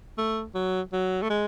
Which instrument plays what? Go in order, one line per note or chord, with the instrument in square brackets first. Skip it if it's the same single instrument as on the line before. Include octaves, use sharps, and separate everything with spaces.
[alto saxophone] A3
F#3
F#3
A3
G#3